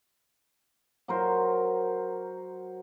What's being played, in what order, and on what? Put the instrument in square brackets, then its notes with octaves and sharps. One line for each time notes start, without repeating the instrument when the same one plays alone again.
[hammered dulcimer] F#3 A#4 C5